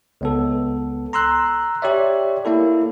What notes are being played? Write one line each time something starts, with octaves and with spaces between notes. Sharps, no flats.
C#2 B3 A4
A#5 C6 E6 F#6
G4 C#5 D5 E5
A#3 E4 A4